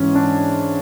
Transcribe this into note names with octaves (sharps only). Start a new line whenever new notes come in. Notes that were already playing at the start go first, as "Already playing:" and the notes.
Already playing: G#2 E3 C#4
D4